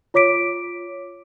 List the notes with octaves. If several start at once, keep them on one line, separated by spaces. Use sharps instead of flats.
F4 C#5 D6 B6 D7